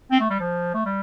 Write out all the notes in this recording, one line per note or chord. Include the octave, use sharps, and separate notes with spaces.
C4
A3
G3
F3
A3
G3